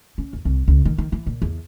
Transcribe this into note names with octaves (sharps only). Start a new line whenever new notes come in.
C#4
D#2
C2
C#2
D#3
D#3
E3
A#2
E2